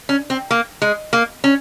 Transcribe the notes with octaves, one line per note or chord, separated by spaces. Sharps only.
C#4
C4
A#3
G#3
A#3
C#4